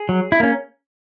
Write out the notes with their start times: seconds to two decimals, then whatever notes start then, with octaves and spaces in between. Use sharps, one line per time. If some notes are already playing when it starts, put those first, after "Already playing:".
Already playing: G#4
0.09 F#3
0.32 E4
0.40 A#3 C#4